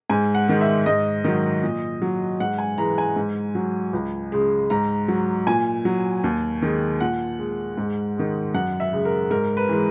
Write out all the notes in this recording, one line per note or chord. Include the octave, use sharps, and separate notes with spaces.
G#2 G#5
F#5
D#3 G#3
E5
G#2 D#5
D#3 F#3
A#2
F#3
G#2 F#5
G#5
E3 G#3 A#5
G#5
G#2
F#3
C#2
C#3 G#3
G#2 A#5
F#3
A#2 G#5
F#3
D#2
D#3 G#3
A#2 F#5
G#3
G#2
D#3 G#3
F#2 F#5
E5
C#3 G#3
A#4
G#2 A#4
B4
E3 G#3